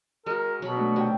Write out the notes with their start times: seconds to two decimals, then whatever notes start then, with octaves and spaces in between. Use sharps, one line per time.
0.26 G#3 F#4 A#4
0.62 B2 F#3 B5
0.76 A3 D4
0.96 C3 F#3 D#4 G5